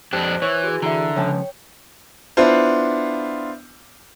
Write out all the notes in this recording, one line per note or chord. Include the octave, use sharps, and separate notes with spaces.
F2 D4 G4 C5 F#6
E3 C#5
F#4 G#4
D3 E3 E5 A#5
C#3 F3 C#5 G5 A5
B3 D4 E4 F4 C5